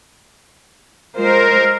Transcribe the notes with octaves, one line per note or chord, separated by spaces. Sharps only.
G#3 F4 A#4 C5